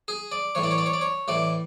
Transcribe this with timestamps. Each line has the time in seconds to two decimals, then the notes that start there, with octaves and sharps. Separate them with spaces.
0.08 G#4
0.32 D5
0.55 A2 E3 C#5
0.63 D5
0.71 C#5
0.78 D5
0.86 C#5
0.93 D5
1.01 C#5
1.28 A2 E3 D5